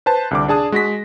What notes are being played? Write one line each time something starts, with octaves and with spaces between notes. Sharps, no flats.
B4 C5 A5
C2 D3 D6
D4 G#4 A5 D#6
G#3 F#4 A#6 B6